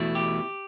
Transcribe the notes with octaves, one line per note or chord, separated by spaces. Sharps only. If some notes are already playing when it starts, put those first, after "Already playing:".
Already playing: E2 B2 A3 E4
G4